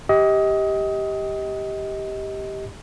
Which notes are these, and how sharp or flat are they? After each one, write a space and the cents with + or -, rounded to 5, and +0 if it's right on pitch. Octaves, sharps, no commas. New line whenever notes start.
G4 +0 D#5 +25